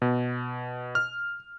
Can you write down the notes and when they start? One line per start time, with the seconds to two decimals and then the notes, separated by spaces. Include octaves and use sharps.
0.02 B2
0.95 F6